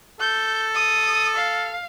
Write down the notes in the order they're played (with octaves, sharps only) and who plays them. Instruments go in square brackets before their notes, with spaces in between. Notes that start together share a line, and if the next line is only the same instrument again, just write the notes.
[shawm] A4 [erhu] G6
[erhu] D#6
F5